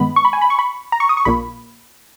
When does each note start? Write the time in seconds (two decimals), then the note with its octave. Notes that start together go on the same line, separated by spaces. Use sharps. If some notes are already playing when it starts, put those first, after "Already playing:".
Already playing: G2 D#3 G#3 B3 B5
0.16 C#6
0.25 B5
0.33 G#5
0.41 B5
0.50 C#6
0.59 B5
0.92 A#5
1.00 C#6
1.09 D#6
1.17 C#6
1.25 A#1 A#2 A#3 B5